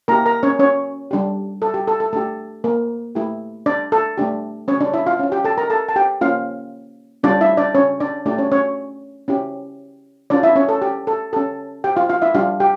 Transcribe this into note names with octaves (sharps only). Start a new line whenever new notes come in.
A#3 E4 G4 A#4 A#5
A#4 A#5
C#4 C#5
C#4 C#5
G3 D4 G4
A4
G4
A4
A4
A3 D4 G4 A4
A#3 A#4
A3 E4 G4
D4 D5
A4
A3 D4 G4
C#4 C#5
D4 D5
E4 E5
F4 F5
C#4 F4
G4 G5
A4 A5
A#4 A#5
A4 A5
A5
G4 G5
A#3 C#4 F4 F5
G3 C#4 D4 F4 D5
E4 E5
D4 D5
C#4 C#5
D4 D5
A3 D4 E4 G4 D5
C#4 C#5
C#4 C#5
C#4 E4 G4
C#4 D4 F4 D5
E4 E5
C#4 C#5
A4
G4
A4
C#4 G4 A4
G4 G5
F4 F5
F4 F5
E4 E5
G3 D4 F4 G4 F5
G4 G5